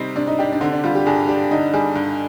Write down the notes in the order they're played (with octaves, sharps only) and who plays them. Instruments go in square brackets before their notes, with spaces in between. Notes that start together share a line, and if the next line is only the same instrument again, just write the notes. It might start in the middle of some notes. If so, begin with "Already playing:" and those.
Already playing: [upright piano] C3 G3 C4 [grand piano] D#4
[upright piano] C3 [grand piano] D4
[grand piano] D#4
[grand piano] D4 [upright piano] G4
[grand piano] D4
[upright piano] D3 [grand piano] C4
[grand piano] D4
[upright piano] G3 [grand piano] F4
[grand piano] G4
[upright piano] G2 [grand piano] G#4
[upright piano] D4 [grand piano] G4
[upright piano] D3 [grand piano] D#4
[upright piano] G3 [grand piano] G#4
[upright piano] G2